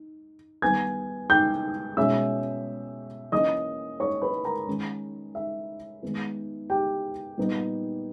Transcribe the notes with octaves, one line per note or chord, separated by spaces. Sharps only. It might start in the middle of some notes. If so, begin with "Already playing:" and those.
Already playing: D#4
D#3 G3 B3 D#4 G#5 G#6
G5 G6
B2 G#3 C#4 E5 E6
E3 A#3 C#4 D#5 D#6
C#5 C#6
B4 B5
A#4 A#5
D#3 G#3 C#4
E5
D#3 G#3 B3 D#4
G4 G5
A#2 G3 B3 D#4